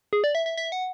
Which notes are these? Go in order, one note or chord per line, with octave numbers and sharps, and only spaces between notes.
G#4
D5
E5
E5
E5
F#5